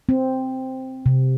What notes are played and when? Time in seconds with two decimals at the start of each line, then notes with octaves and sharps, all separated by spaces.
0.09 C4
1.06 C3